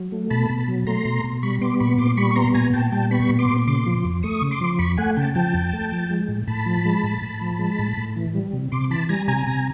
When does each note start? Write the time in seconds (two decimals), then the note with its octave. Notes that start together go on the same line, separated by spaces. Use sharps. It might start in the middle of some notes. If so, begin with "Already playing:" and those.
Already playing: F#3
0.12 A3
0.30 B2 A5 B5
0.50 B2
0.68 F#3
0.87 A3 A#5 C6
1.05 B2
1.24 B2
1.43 G3 B5 C#6
1.61 B3 C6 D6
1.80 A#2 B5 C#6
1.98 A#2 C6 D6
2.17 G3 B5 C#6
2.31 C#6
2.36 B3 A#5 C6
2.54 A#2 G#5 A#5
2.73 A#2 G5 A5
2.92 G3 G5 A5
3.11 B3 B5 C#6
3.29 A#2
3.39 C6 D6
3.49 A#2
3.67 C#3 C6 D6
3.86 F3
4.05 F2
4.23 A3 C#6 D#6
4.42 C#3
4.51 C6 D6
4.61 F3
4.79 F2 B5 C#6
4.97 A3 F#5 G#5
5.16 C#3 G5 A5
5.35 F3 G5 A5
5.54 F2
5.73 A3
5.92 F3
6.10 G#3
6.28 A2
6.47 A2 A5 B5
6.66 F3
6.85 G#3
7.03 A2
7.22 A2
7.41 F3
7.59 G#3
7.79 A2
7.97 A2
8.16 E3
8.34 G3
8.53 C3
8.72 C3 C6 D6
8.90 E3 A5 B5
9.09 G3 G#5 A#5
9.28 C3 G#5 A#5
9.47 C3